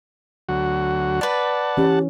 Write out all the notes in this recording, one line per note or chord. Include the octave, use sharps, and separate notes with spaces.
D2 F#3 F#4
B4 D5 F#5 A5
E3 C#4 G4